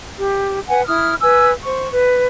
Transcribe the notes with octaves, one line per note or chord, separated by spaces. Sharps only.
G4
B4 F#5 G#5
E4 D#6 F6
B4 G#5 E6
C5 C#6
B4